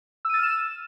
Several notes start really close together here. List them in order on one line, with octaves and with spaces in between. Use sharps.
E6 D#7 A6 F6 E7